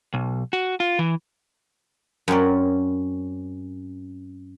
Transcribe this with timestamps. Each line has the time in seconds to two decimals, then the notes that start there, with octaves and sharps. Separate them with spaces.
0.14 B1
0.53 F#4
0.80 F4
0.99 E3
2.28 F#2 C4 C#4 D5